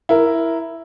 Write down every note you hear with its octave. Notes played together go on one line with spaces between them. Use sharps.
E4 A#4